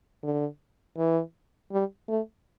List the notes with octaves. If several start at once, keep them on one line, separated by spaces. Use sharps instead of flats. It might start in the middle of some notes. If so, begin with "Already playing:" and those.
D3
E3
G3
A3